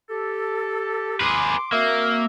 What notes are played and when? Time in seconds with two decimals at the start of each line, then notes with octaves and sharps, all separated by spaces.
0.10 G4 A4
1.21 G#4 B4 C6 D6
1.72 A#3 C4 F#4 E5